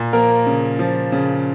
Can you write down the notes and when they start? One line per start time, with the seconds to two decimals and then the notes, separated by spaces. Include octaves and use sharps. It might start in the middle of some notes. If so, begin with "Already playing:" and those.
Already playing: A#2
0.13 F3 A#3 A#4
0.47 C#3
0.79 F3
1.12 C#3